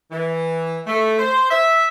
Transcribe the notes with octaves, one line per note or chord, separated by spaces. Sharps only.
E3
A3
C5
E5